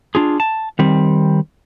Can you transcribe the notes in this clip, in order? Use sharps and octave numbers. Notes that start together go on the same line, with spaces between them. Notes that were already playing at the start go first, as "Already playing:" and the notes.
D4 F4 G#4
A5
D#3 G3 C4